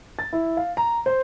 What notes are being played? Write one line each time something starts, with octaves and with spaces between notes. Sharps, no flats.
A6
E4
F5
A#5
C5